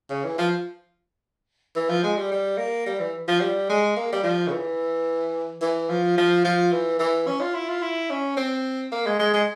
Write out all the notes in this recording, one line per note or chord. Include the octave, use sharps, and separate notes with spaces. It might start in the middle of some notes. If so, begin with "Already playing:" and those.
C#3
E3
F3
E3
F3
G#3
G3
G3
A#3
G3
E3
F3
G3
G#3
A#3
G3
F3
C#3
E3
E3
F3
F3
F3
E3
E3
C#4
F4
E4
F4
E4
C#4
C4
A#3
G#3
G#3
G#3